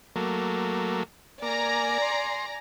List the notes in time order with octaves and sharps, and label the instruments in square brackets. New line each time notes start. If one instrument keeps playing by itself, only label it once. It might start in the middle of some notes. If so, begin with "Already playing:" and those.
[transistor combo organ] F#3 A3 A#3
[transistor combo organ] A#3 [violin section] D5 G#5 A#5
[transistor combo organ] C6